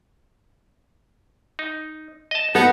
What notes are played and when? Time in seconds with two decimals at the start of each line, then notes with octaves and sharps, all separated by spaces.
1.59 D#4
2.31 D#5 A5
2.55 B3 D#4 A4